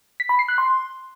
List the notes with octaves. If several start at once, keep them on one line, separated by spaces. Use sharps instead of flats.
B6
B5
C7
F#6
C6